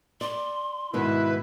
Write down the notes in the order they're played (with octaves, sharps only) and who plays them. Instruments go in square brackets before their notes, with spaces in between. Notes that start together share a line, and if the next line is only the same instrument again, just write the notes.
[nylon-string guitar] D5 [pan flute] C6
[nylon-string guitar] G#2 B2 D#3 [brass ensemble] E4 [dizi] B4